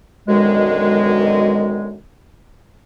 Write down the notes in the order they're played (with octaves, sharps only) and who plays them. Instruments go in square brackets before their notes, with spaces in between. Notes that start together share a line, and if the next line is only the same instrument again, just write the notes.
[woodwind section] F#2 B2 D3 D#3 G#3